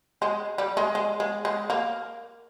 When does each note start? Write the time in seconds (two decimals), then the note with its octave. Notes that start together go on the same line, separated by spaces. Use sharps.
0.22 G#3
0.58 G3
0.77 G#3
0.95 G#3
1.20 G#3
1.45 G#3
1.70 A#3